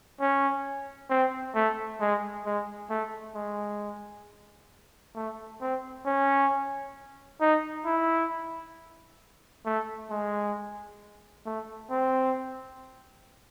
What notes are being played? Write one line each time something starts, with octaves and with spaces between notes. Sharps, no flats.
C#4
C4
A3
G#3
G#3
A3
G#3
A3
C4
C#4
D#4
E4
A3
G#3
A3
C4